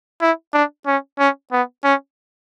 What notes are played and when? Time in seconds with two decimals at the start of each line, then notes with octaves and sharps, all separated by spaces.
0.21 E4
0.54 D4
0.87 C#4
1.19 C#4
1.52 B3
1.84 C#4